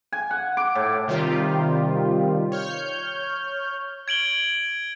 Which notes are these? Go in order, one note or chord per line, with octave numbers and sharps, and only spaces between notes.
G#5
F#5
D6
A2
C3 D#3 G3 F4 G4
C#5 F6 G6
G#6 D7 F#7 G7